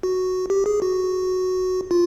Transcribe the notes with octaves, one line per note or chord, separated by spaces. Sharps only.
F#4
G4
G#4
F#4
F4